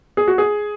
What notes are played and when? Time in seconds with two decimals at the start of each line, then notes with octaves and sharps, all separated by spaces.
0.17 G#4
0.28 F#4
0.38 G#4